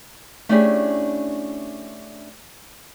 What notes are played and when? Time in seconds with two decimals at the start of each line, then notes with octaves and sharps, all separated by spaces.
0.49 A3 C#4 D4 E4 G4 G#4